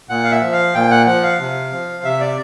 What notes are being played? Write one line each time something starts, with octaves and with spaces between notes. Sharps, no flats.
A#2 F#5
F5
E5
F3
F5
A#2 G5
F#5
F3 F#5
F5
C3
F3
C3 E5
D5